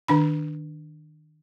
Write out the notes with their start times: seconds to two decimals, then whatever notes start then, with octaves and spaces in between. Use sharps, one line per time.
0.08 D#3 D4 B5